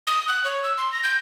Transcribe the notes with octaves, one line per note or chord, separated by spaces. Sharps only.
D#6
F#6
C#5
E6
C6
A#6
G6